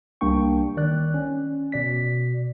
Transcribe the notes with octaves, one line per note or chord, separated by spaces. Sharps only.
C2 G3 A#3 D4 G5 C#6
D#3 D5 F#6
C#4
B2 D5 B6